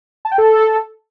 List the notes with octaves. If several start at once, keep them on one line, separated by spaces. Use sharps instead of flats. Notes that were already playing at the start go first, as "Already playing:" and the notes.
A5
G5
A4